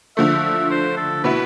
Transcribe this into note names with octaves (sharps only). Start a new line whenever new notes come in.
D3 F3 A3 E5
E5
C5
A4
B2 B3 E4 B4